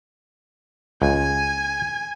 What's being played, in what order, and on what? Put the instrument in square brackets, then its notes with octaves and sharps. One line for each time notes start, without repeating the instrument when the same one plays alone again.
[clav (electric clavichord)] C#2 [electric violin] G#5